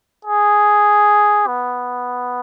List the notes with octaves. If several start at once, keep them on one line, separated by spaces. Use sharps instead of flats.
G#4
B3